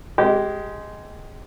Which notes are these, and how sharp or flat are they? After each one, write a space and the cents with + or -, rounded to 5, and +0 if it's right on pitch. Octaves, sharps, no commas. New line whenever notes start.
G#3 +0 G4 -20